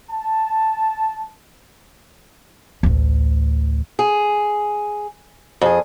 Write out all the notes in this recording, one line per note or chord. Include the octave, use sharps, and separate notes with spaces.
A5
A1 D2
G#4
F2 G#4